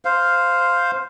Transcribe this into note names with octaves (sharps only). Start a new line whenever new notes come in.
C5 F5